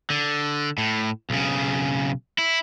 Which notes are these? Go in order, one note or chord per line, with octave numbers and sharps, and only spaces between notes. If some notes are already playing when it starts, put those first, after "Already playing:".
D3
A2
B1 C#3
E4